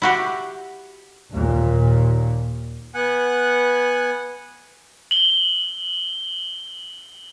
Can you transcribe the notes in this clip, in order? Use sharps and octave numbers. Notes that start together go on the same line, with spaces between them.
E4 F#4 G4
D#2 A#2
B3 F#5 G#5 F#6
F#7 G7